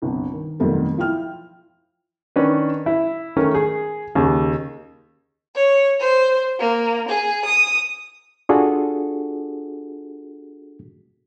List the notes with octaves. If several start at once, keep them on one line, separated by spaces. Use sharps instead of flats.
G1 C2
D#3
F2 B2 D#3 F#3 G3 A3
F3 E4 G5 F6
D#3 C#4 D4 B4
E4
D#3 A3 C#4 A#4
G#4
D#2 C#3
C#5
C5
A#3
G#4
D#6
D4 F4 F#4 G#4 A4